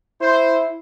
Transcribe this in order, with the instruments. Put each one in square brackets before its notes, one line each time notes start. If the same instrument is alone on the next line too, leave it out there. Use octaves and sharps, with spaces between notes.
[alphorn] E4 [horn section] C5